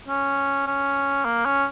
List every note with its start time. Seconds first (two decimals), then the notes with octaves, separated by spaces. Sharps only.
0.08 C#4
0.67 C#4
1.25 A#3
1.46 C#4